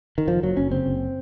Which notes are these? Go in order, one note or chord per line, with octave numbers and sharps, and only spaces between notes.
D#3
F#1 F3
F#1 F#3
F#1 C#4
C#3 C4
F#1